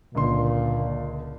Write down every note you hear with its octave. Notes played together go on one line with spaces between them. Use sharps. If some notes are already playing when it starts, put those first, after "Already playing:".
C#2 A#2 D3 C6